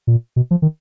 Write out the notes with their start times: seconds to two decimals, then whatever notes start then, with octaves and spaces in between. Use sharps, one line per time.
0.07 A#2
0.36 B2
0.51 F3
0.62 D#3